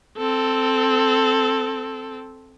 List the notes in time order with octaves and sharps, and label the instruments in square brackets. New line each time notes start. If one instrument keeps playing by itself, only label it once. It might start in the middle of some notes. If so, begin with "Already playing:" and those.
[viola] C4 A4